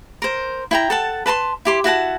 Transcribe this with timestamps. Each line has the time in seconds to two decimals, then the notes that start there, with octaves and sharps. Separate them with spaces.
0.22 A#4 C5
0.71 E4 G5 A#5
0.90 A4 F#5 A5
1.26 B4 A5 A#5 C6
1.65 E4 G4 C6
1.84 E4 F#4 F#5 A5